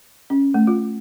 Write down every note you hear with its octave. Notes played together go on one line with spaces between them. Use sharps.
C#4
A3
F4